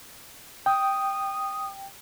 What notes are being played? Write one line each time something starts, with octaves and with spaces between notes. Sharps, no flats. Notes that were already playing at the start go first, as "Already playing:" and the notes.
G5 D#6